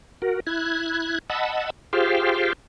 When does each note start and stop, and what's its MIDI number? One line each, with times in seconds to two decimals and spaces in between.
0.22 0.40 66
0.22 0.40 70
0.47 1.19 64
0.47 1.19 90
0.47 1.19 92
1.30 1.70 75
1.30 1.70 78
1.30 1.70 81
1.30 1.70 83
1.30 1.70 88
1.93 2.53 65
1.93 2.53 67
1.93 2.53 68
1.93 2.53 72
1.93 2.53 77
1.93 2.53 79